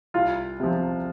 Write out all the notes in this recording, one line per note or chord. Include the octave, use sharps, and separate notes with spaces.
C2 F4
C3 F3